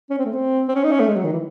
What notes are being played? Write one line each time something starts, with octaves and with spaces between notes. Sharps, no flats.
C#4
C4
A3
C4
C4
C#4
D#4
C#4
A3
G#3
F#3
D#3
E3